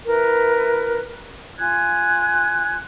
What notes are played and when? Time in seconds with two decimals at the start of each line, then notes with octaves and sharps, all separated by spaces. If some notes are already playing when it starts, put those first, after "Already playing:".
0.06 E4 A#4 B4
1.59 F4 G#5 F#6 G#6